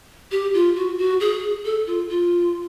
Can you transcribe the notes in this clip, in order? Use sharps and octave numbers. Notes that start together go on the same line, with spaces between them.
G4
F4
F#4
F#4
G#4
A4
F4
F4